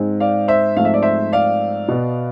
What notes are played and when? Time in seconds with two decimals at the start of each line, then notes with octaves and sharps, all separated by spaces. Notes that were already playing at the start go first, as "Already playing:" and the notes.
Already playing: G#2 G#3 C4
0.20 D5 F5
0.48 C5 E5
0.76 G#2 F3 A3 C4 F5
0.85 E5
0.94 D5
1.02 C5 E5
1.33 D5 F5
1.88 B2 B3